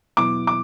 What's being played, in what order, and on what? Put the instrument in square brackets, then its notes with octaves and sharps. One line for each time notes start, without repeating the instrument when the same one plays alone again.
[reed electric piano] E2 B2 F#3 B3 E4 [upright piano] D6
[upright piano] D6